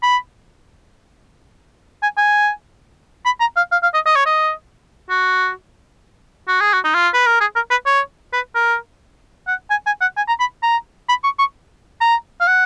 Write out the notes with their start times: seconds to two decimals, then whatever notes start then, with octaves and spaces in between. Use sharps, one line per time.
0.02 B5
2.02 G#5
2.17 G#5
3.25 B5
3.40 A#5
3.57 F5
3.72 F5
3.83 F5
3.94 D#5
4.06 D#5
4.16 C#5
4.26 D#5
5.10 F#4
6.48 F#4
6.61 G#4
6.73 F#4
6.84 D#4
6.94 F4
7.14 B4
7.26 A#4
7.40 G#4
7.55 A#4
7.71 B4
7.86 C#5
8.33 B4
8.55 A#4
9.47 F#5
9.70 G#5
9.86 G#5
10.01 F#5
10.17 G#5
10.28 A#5
10.40 B5
10.62 A#5
11.09 B5
11.24 C#6
11.39 C#6
12.01 A#5
12.41 F5
12.47 F#5